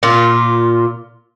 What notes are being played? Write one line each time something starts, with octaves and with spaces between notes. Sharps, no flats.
A#2 F4